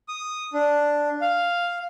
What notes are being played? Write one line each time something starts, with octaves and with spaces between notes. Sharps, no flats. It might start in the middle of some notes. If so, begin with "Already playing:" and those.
D#6
D4
F5